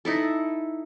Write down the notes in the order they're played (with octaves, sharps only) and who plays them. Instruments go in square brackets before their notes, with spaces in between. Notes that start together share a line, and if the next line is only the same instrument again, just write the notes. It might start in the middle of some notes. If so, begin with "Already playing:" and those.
[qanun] D#4 E4 A4